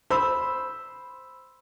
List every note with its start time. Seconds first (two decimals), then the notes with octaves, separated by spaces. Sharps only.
0.10 C5 B5 E6